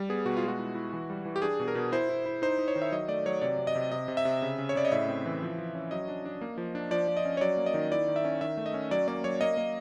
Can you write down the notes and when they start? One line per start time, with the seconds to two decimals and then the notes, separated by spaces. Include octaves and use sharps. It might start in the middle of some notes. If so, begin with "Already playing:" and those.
Already playing: G3
0.09 B3 G#4
0.25 B2 F#4
0.37 F4
0.43 G#3
0.48 F#4
0.59 E4
0.75 E4
0.93 E3
1.10 G3
1.25 E3
1.36 G4
1.42 D4 G#4
1.60 B2
1.68 A#4
1.75 B2
1.92 E4 C5
2.09 E4
2.26 E4
2.42 D#4 C5
2.59 D#4
2.68 C#5
2.75 D#3
2.82 E5
2.92 F#3 D#5
3.08 A3 D5
3.26 F#3 C#5
3.41 C3 D5
3.59 C3
3.67 D#5
3.75 C3
3.92 C3 D#5
4.08 C3
4.17 E5
4.25 C3
4.42 C#3
4.58 C#3
4.69 C#5
4.75 C#3 D5
4.85 D#5
4.92 A2 E5
5.08 C4
5.26 E3
5.42 F3
5.58 F3
5.75 C#4
5.91 F#3 D#5
6.08 D4
6.25 D4
6.41 A#3
6.58 F3
6.75 D4
6.91 F3 D5
7.08 F3
7.17 D#5
7.25 C#4
7.37 C#5
7.41 F#3 D5
7.57 A#3
7.66 D#5
7.74 D#3
7.92 E4 D5
8.08 D#3
8.16 E5
8.25 C#4
8.41 D#3 E5
8.57 A3
8.66 D#5
8.74 C#4
8.91 F#3 D5
9.08 A#3 D5
9.24 F#3 C#5
9.41 A#3 D#5
9.57 A#3